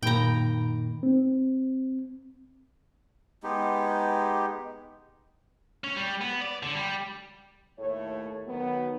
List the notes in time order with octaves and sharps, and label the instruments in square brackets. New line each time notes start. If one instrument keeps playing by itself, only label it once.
[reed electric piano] F#2 D#3 A#3 [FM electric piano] A#2 [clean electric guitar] D#4 B5 [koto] G5 A#5
[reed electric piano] C4
[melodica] G#3 B3 D#4 G4
[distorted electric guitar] C#4
G3
B3
D5
D3
G3
[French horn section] D#2 A2 A3 C#5
D#3 F#3 B3